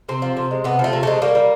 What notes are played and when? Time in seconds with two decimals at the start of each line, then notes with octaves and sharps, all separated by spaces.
0.09 C3 C4
0.22 F3
0.37 C3
0.51 G#3
0.64 C3 B3
0.79 F3 A3
0.93 C3
1.03 G#3 A3
1.22 G3 A#3
1.35 G3